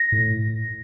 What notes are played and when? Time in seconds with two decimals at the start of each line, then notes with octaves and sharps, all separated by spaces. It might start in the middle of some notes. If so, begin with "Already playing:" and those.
Already playing: A#6
0.12 A2